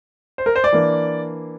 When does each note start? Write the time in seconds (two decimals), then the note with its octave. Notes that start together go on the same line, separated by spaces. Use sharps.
0.38 C5
0.46 A#4
0.56 C5
0.64 D5
0.73 E3 A#3 D4